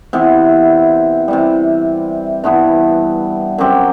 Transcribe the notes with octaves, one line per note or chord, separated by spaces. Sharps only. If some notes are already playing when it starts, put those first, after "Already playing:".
C3 E3 B3
C3 E3 G3
G2 E3 B3
F#2 F#3 C4 G4